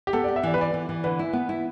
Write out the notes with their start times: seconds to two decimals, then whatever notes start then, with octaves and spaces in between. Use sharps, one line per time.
0.07 G4
0.13 B3 A4
0.24 G4 D5
0.36 E5
0.43 E3 D5
0.54 B4
0.58 E3 D5
0.74 E3
0.89 E3
1.04 D3 B4
1.19 E4
1.33 B3
1.49 E4